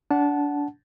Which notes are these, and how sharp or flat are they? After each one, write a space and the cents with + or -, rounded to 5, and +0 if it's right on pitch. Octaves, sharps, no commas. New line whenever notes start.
D4 -25 F#5 +0 A5 -15